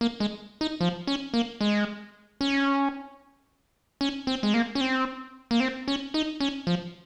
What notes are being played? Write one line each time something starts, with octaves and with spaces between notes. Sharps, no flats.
A#3
G#3
D#4
F3
C#4
A#3
G#3
C#4
C#4
C4
G#3
A#3
C#4
C4
A#3
C4
C#4
D#4
C#4
F3